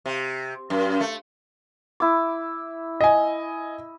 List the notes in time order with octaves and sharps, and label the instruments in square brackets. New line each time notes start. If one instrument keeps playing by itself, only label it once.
[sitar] C3
F#2
A3
[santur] E4 D6
[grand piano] D#5 G#5